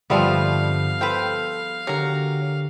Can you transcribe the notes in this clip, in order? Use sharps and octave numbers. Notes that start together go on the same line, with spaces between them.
G2 D3 F3 G3 A3 B3 C4 F5
A4 B4 C5 G5
D3 F#3 G4 A#4